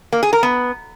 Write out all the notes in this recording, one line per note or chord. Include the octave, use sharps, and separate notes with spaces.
A#3
G#4
A#4
B3